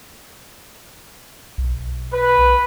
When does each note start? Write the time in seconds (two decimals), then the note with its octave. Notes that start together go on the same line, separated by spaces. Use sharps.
1.58 B1
2.13 B4